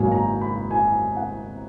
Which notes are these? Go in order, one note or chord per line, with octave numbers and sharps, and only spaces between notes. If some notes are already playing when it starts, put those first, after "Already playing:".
Already playing: G#1 G#2 F#3 A#3 G#5
A#5
B5
G#5
F#5